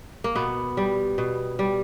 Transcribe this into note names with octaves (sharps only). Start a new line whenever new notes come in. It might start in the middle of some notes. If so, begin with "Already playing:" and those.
A#3
B2 B3
G3
B2
G3